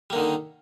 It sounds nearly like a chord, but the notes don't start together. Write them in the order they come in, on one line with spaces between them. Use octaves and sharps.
G3 A#3 D3 D#3